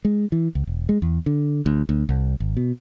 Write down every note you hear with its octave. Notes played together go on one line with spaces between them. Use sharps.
G#3
E3
C#2
E1
G#3
E2
D3
D2
D2
C2
G#1
B2